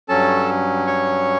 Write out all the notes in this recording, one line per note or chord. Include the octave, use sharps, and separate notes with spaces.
G2 F#3 C#4 A4 A5
C#5 C#6